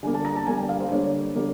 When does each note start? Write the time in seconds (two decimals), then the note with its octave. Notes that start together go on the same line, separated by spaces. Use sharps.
0.03 D3 G3 A#3 G#5
0.14 A5
0.25 A#5
0.36 A5
0.47 D3 G3 A#3 G#5
0.58 G5
0.69 F5
0.80 C5
0.91 D3 G3 A#3 C#5
1.35 D3 G3 A#3